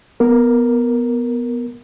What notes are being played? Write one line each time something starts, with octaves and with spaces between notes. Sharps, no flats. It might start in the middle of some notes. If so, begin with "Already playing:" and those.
B3 A#4